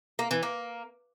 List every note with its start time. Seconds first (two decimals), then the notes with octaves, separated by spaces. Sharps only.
0.19 A#3
0.31 E3
0.43 A#3